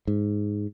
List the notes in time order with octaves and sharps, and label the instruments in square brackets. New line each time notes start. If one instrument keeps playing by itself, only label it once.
[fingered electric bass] G#2